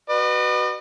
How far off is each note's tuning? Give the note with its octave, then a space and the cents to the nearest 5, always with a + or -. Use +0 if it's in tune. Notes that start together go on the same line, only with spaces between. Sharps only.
F#4 +25 B4 +0 D#5 -45